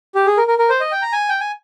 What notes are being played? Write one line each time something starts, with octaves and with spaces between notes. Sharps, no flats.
G4
G#4
A#4
A#4
A#4
C5
D#5
G5
A#5
G#5
G5
G#5